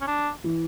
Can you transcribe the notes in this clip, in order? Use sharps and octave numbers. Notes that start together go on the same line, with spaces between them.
C#4
D4
E3